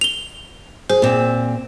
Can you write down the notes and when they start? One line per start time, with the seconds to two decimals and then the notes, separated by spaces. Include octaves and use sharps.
0.01 F7 G7
0.90 G#4 C5
1.02 A#2 C4